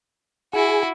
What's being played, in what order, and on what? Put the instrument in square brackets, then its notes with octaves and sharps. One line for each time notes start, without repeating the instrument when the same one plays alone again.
[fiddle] E4 F#4 [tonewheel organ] G#4